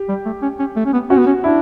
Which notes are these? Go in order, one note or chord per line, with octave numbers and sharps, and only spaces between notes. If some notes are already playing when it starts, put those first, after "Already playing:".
Already playing: G4
G3
A3
C#4
C#4
A3
C#4
B3
C#4 F#4
B3
C#4
D4 E4